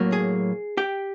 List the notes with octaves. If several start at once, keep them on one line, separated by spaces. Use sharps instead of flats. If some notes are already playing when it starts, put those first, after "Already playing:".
Already playing: A2 F#3 A#3
G#4 G#5
G4 G5